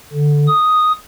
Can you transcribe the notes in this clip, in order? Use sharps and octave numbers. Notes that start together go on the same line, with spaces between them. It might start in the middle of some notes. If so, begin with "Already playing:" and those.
D3
D#6